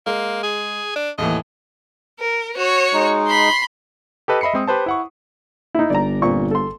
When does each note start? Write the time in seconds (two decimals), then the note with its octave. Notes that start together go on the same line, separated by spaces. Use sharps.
0.06 G#3 A#3
0.43 G#4
0.96 D4
1.18 D#2 A2 E3 D#5
2.20 A#4
2.57 F#4 C#5
2.93 G#3 D#4
3.26 B5 C6
4.28 G4 A4 B4 D#5
4.41 D#5 E5 B5 C7 C#7
4.53 G#3 C4 D#6
4.68 G4 B4 C5 A5
4.86 E4 F#5 C#6
5.75 D#4 E4
5.90 G1 D5 A#5
6.22 A#2 C4 C#6
6.51 A4 C6